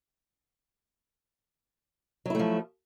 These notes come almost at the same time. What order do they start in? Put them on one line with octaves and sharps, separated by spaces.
F#3 E4 A3 F3